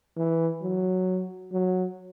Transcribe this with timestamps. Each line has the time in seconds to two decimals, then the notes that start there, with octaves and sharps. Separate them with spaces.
0.17 E3
0.62 F#3
1.52 F#3